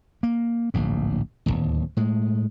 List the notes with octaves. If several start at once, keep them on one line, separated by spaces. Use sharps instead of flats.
A#3
D1 A#1 G#2
D1 G1 D#2
A2 G#3